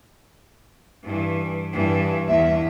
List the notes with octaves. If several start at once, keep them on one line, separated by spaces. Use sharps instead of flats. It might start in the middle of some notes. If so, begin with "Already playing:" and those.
G2 E3
G2 E3
E2 G2 E5